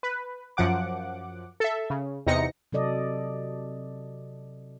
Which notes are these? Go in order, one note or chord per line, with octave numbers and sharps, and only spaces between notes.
B4
F#2 F3 F#5 D6
A4 E5
C#3
E2 C3 D#4 A#6 C#7
C3 F#3 A4 D5 D#5